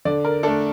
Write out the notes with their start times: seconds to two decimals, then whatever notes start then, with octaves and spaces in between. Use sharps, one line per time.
0.05 D3 D5
0.25 A#4
0.43 A3 D4 A4